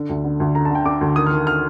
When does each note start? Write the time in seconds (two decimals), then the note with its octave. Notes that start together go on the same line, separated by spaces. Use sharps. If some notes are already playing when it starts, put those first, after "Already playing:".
Already playing: D3
0.09 D2
0.25 D3
0.40 D2
0.55 D3 A#5
0.65 A5
0.70 D3 G5
0.86 D3 D6
1.01 D2
1.16 D#3 D#6
1.26 F6
1.31 D#3
1.47 F6